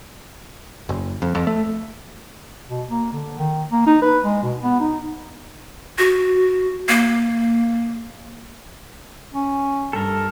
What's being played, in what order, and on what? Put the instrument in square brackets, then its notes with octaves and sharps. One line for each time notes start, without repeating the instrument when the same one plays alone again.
[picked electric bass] F#1
F2
F2
A3
[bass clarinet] B2
A#3
D3
D#3
A#3
D#4
B4
G#3
B2
B3
D#4
[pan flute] F#4
A#3
[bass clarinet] C#4
[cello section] G2 [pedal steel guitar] A4 A#4